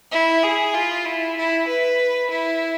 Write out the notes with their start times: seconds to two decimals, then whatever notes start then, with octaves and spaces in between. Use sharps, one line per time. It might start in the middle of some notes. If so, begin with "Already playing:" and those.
0.12 E4
0.43 G#4
0.74 F4
1.05 E4
1.37 E4
1.67 B4
2.30 E4